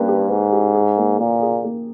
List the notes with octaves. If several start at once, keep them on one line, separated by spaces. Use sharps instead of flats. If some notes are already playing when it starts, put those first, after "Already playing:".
Already playing: G2 A#3 C#4 B4
G4
G#2 B4
G4
G#4
A#3
A#2 A#3
G#4
A#3